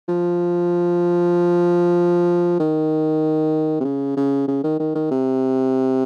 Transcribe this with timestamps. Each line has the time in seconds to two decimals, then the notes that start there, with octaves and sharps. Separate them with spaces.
0.09 F3
2.60 D#3
3.80 C3
3.85 C#3
4.17 C#3
4.48 C#3
4.64 D#3
4.80 D#3
4.95 D#3
5.11 C3